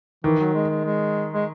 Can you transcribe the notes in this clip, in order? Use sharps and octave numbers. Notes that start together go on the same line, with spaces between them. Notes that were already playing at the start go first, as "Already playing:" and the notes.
D#3 E3
F#3
G#3
G#3
G#3
G#3